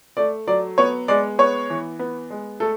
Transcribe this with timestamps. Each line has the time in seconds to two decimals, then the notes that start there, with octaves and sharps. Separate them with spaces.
0.17 A3 D5
0.47 F#3 D5
0.78 B3 C#5
1.08 G#3 D5
1.39 B3 C#5
1.70 E3
1.99 B3
2.30 G#3
2.60 A3 A4